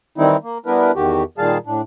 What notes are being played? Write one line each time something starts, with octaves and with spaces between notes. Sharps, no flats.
D#3 E3 G3 C4 D#4 E4
A#3
G3 B3 D4 E4 A#4 B4
E2 D#3 F#4 G4
A#2 D#3 G3 G#4 F5 A5
A2 D4